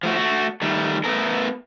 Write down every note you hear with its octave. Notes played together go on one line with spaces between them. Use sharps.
F3 A3 F#4
A3 F#4
D#3 G3 A3
A3 B3 A4 A#4